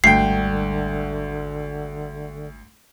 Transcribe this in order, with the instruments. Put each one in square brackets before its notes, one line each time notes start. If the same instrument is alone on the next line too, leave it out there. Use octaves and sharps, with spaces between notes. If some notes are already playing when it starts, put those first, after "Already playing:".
[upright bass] G#1 G3 [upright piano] D2 G5 [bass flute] D3 [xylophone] C7